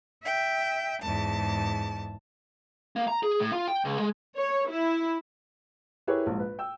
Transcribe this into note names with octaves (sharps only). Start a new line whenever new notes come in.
E5 G5
E2 G#2 A5
A#3
A#5
G#4
A2
F4
G5
C#2
G#3
C#5
E4
E4 G4 G#4 A#4 B4 C#5
A#1 G#2
B4
G5 E6